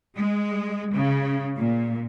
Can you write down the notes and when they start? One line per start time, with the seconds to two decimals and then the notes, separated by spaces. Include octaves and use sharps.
0.17 G#3
0.94 C#3
1.58 A#2